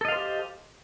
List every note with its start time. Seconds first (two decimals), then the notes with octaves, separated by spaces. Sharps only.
0.01 A4
0.05 D#5
0.08 F5
0.12 C5
0.16 G4